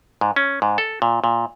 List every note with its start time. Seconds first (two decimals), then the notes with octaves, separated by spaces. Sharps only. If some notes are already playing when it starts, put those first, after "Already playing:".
0.21 G#2
0.36 C#4
0.62 G#2
0.78 A4
1.02 A#2
1.24 A#2